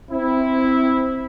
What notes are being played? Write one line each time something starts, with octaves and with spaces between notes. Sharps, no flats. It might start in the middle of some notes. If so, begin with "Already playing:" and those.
C4 E4